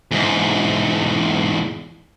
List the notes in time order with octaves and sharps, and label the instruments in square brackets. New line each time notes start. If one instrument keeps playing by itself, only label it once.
[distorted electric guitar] E2 G#2